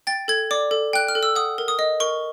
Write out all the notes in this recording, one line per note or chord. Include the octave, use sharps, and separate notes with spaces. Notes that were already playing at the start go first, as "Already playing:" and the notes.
G5 A6
A4 G#6
D5 D6
A4
G5 F#6
F6
A4
E6
F#5 D#6
A#4
D#6
D#5
A#4 C#6